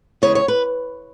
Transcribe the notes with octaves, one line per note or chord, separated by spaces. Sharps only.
E2 C#3 G#3 C#5
C#5
B4